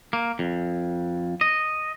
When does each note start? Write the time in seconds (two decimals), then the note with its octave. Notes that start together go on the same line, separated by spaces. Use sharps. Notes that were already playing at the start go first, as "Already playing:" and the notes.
0.13 A#3
0.39 F2
1.41 D#5